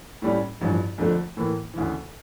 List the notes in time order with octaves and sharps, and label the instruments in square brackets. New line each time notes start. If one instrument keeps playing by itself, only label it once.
[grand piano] A2 G3 C#4
A1 G2 F3
F2 D3 F3 A3
A2 E3 A#3
D2 C#3 E3